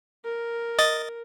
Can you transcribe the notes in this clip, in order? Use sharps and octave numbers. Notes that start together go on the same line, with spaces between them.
A#4
D#5 A6